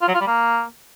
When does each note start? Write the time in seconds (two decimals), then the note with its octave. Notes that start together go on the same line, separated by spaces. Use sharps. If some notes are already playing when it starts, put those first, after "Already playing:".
0.02 F4
0.08 F#3
0.14 F4
0.21 G3
0.27 A#3